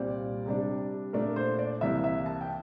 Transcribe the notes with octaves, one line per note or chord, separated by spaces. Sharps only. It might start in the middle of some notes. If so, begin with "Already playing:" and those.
Already playing: C2 A#2 G3 C4 D5
C3 G3 D4
A#2 A3 D4 A#4
C5
D5
C2 C3 E3 A#3 E5
E5
A5
G5